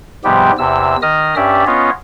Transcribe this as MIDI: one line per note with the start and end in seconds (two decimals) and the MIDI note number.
0.24 0.52 44
0.24 0.52 48
0.24 0.52 53
0.24 0.52 55
0.24 0.52 59
0.24 0.52 67
0.58 0.96 40
0.58 0.96 48
0.58 0.96 88
1.02 1.35 51
1.02 1.35 75
1.02 1.35 87
1.02 1.35 89
1.36 1.64 43
1.36 1.64 61
1.36 1.64 67
1.36 1.64 74
1.36 1.64 76
1.67 1.90 59
1.67 1.90 61
1.67 1.90 65
1.67 1.90 73
1.67 1.90 75